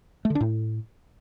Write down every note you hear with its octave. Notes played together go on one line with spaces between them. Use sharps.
A3
D3
D4
A2